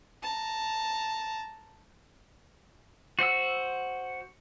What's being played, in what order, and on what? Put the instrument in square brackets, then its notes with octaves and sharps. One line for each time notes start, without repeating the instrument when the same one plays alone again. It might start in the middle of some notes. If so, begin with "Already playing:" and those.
[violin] A5 A#5
[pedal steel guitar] F#4 C5 F#5 E6